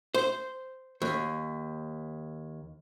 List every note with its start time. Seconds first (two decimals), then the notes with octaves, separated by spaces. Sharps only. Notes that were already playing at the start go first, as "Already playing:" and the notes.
0.14 C5
1.02 D#2